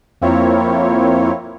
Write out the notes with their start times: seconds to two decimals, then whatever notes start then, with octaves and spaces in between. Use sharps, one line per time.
0.21 F2 A#3 C4 E4 F4 C#5